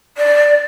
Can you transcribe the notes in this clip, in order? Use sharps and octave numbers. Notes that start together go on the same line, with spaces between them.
D5